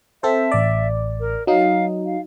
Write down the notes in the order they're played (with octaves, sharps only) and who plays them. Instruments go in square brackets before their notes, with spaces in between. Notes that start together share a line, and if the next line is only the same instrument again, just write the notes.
[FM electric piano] C4 A4 C5 [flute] E5
[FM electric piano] A1 D5
[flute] A#4
[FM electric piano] F#3 D#4 [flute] F5
[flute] F5